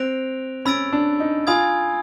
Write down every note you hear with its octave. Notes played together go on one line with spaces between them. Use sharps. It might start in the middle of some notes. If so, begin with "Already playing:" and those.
Already playing: C4 F#6 A#6 D7 F7
C#4 B5 E6 A6 D7
D4
D#4
F4 G#5 B5 D#6 G#6